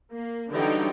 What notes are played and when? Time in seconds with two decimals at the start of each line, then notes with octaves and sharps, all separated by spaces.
0.15 A#3
0.51 D3 E3 F#3 G3 D#4 G5